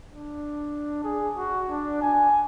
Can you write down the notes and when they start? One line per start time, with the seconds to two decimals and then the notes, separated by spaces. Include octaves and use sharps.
0.13 D4
1.04 G#4
1.37 F#4
1.69 D4
2.02 G#5